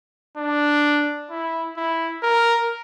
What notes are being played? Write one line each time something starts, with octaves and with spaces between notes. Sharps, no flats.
D4
E4
E4
A#4